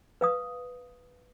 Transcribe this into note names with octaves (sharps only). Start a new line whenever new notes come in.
B4 F5 D#6